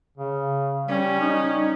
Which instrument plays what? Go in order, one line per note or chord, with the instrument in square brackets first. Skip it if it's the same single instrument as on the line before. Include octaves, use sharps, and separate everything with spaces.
[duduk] C#3
[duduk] G3 [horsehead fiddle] C#4
[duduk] D#4